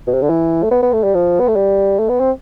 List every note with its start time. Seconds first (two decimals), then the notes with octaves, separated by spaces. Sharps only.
0.07 B2
0.14 C3
0.22 D3
0.30 E3
0.63 A3
0.71 B3
0.83 B3
0.93 A3
1.03 G3
1.15 F3
1.40 B3
1.48 A3
1.56 G3
1.99 A3
2.09 B3
2.20 C4